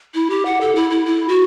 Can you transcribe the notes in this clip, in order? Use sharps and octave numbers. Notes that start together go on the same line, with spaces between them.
E4
G4
F#5
A4
E4
E4
E4
F#4